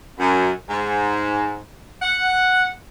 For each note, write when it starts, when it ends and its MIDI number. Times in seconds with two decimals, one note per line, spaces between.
0.18 0.50 42
0.70 1.59 44
2.02 2.68 78